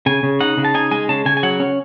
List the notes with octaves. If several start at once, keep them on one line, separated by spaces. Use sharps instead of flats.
C#3 G#5
C#3
D#4 F#5
C#3
A5
D#4 G#5
G#3 G#5
C#3 A5
C#3 G#5
G#5
F#3 F#5
C#4